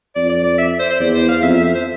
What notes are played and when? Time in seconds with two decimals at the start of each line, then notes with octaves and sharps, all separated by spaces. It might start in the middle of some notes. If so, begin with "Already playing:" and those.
0.16 F2 D5
0.30 D5
0.44 D5
0.58 E5
0.69 E5
0.79 C5
0.90 C5
1.00 E2 D5
1.15 C5
1.29 F5
1.43 F2 E5
1.54 E5
1.65 E5
1.75 C5